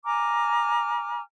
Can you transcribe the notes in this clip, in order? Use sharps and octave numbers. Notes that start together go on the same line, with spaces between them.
G#5 A#5 D6 F6